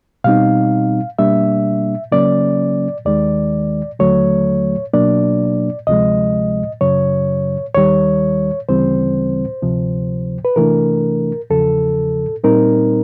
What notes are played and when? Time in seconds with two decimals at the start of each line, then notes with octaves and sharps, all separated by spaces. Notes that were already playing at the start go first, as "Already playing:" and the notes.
0.24 B2 G3 C4 D#4 F5
1.19 B2 G3 A#3 D4 E5
2.12 C#3 F#3 A#3 C#4 D5
3.05 D#2 D#3 G#3 D5
3.99 D#2 D3 F#3 A3 C#5
4.93 B2 F#3 A#3 D4 D5
5.87 D2 C3 F3 G#3 D#5
6.81 F#2 C#3 F#3 C#5
7.75 D#2 D#3 G3 C#5
8.69 D2 C#3 E3 G3 C4 C5
9.62 D2 C3 F3
10.45 B4
10.56 C3 E3 A3 D4 A#4
11.50 E2 C#3 F3 A4
12.44 A#2 G3 C4 D#4 A#4